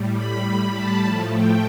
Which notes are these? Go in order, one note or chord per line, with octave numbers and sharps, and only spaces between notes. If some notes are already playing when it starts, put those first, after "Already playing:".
Already playing: A2 G3
B5
B5
A5
A2 F3 A3 A5
G5